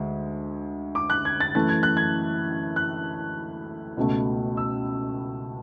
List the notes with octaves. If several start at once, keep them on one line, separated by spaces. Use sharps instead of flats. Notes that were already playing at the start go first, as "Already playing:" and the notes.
Already playing: D2 G#3
D6
F#6
G#6
A6
F#2 E3 A3 A6
G#6
F#6
G#6
F#6
C#2 B2 A3
E6